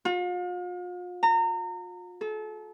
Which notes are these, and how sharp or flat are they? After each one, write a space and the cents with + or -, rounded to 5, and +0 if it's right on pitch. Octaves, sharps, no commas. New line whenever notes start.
F4 +40
A#5 -30
A4 -35